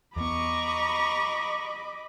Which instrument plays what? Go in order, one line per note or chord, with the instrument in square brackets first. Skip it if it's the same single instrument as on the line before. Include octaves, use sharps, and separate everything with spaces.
[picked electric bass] E2 B3 [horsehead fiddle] D#5 B5 [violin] A#5 C#6 [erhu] D6